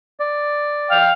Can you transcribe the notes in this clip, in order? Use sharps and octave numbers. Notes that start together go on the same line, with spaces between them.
D5
F5 G5 F6